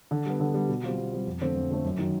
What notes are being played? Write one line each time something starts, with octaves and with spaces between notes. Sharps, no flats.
D3
G3 B3
D3
G3 B3
B2
G3 C4 F4
B2
G3 C4 F4
F2
D3 F3 A3 C4
F2
D3 F3 A3 C4
F#2
D#3 F#3